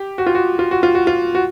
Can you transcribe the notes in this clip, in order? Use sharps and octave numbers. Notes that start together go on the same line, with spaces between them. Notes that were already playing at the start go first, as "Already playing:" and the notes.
Already playing: G4
F#4
F4
F#4
F4
F#4
F4
F#4
F4
F#4